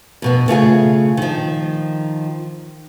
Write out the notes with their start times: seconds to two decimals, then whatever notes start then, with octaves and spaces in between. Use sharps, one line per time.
0.22 F2 B2 B3
0.48 C#3 A3 F4 G#4
1.17 D#3 F3